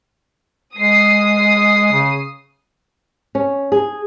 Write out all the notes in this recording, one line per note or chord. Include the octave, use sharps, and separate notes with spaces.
G#3 D#6 C7
C#3
C#4
G#4